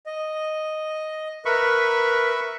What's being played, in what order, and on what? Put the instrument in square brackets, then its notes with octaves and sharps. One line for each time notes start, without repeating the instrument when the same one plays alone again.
[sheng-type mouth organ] D#5
[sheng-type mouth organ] A#4 B4 [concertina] E5 B5 C#6